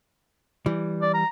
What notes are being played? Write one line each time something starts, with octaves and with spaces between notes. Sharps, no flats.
E3 G3
D5
A#5